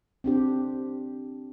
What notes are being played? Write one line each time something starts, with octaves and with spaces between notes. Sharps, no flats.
C4 D4 G4